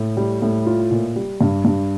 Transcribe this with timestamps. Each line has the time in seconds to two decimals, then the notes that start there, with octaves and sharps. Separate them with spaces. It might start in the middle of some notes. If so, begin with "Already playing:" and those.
Already playing: A2
0.17 G3
0.42 A2
0.67 F4
0.91 A#2
1.16 G3
1.41 G2
1.65 G2